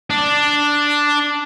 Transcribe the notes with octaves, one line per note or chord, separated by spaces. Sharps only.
D4